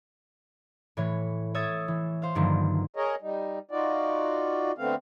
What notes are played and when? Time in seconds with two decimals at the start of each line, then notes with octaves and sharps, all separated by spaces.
0.97 A2 E3 C#5
1.54 C#5 E5 D#6 G#6 A6
1.88 E3
2.22 C5 F5
2.35 G2 D3 D#3 F3 F#3 A#3
2.96 G#4 A#4 C#5 D#5
3.22 G3 D#4
3.71 D#4 F4 F#4 D5
4.78 D3 A3 B3 C4 F5